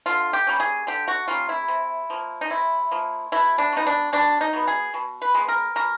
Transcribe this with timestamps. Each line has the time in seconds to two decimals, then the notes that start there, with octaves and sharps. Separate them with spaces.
0.06 D3 F4
0.33 G4
0.47 G3 A#3 C#4
0.60 G#4
0.87 D3 G4
1.08 F#4
1.28 G3 A#3 C#4 F4
1.49 E4
1.68 C3
2.10 F3 A#3
2.41 D#4
2.50 C3 E4
2.91 F3 A#3
3.32 B2 E4
3.58 D4
3.72 F#3 B3 D#4
3.86 D4
4.13 B2 D4
4.41 D#4
4.53 F#3 B3
4.68 G#4
4.94 B2
5.22 B4
5.34 G#3 B3
5.48 A#4
5.76 B2 A#4